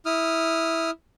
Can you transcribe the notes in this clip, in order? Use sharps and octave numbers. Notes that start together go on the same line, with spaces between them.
E4 D#6 F6